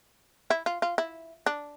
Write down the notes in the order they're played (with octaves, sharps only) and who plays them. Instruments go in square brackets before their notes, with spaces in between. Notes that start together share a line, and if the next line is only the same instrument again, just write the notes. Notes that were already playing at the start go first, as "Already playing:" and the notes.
[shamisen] E4
F4
F4
E4
D4